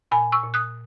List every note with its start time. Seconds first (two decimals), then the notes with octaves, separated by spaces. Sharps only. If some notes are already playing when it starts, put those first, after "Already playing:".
0.11 A#2 G#5 B5
0.32 C#6 E6
0.43 A#2
0.54 D#6 F#6